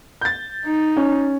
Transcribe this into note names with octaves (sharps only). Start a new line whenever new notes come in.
G6 A6
D#4
C#4